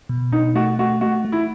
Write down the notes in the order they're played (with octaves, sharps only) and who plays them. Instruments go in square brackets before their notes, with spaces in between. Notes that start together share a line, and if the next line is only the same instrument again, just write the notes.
[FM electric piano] B2
[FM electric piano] B2 [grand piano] D#4
[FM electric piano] A3 [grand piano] F#4
[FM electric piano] A3 [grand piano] F#4
[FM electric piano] A3 [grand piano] F#4
[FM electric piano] A3
[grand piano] E4